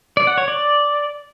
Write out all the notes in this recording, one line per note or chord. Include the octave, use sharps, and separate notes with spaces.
D5
F#5
C#5
D5